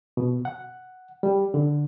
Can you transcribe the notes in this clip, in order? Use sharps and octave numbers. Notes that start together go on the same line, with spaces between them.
B2
F#5
G3
D3